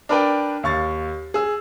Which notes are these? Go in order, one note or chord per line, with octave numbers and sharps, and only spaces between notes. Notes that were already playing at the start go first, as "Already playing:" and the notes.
D4 A#4 B4 D5 G5
D#2 F5 C#6 A6
G#4 E6